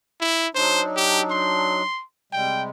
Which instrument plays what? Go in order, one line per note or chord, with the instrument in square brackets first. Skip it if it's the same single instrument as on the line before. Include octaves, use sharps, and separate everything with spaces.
[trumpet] E4
[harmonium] F#3 D4 D#4 [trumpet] C5
[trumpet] G4
C6
[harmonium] C3 G3 G#3 [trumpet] G5